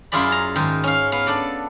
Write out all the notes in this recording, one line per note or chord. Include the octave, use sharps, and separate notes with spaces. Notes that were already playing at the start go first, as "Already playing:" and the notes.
F#2 E4 F4 G#4 D5 B5
A#5
G#2 D#3
C#4 F5
B3 F5
D4 A4 D5